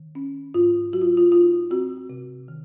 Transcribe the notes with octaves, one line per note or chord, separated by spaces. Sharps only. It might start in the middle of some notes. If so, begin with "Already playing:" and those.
Already playing: D#3
C#4
G#2 F4
F#3 F#4
F4
F4
D#4 F4
C4 F#4
C3
D#3